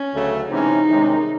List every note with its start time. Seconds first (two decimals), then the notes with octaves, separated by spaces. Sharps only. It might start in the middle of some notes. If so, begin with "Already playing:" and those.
Already playing: C#4
0.13 D2 C#3 F#3 A3
0.50 C3 E3 G#3 C#4 D#4
0.87 C2 C3 D#3 G#3 C#4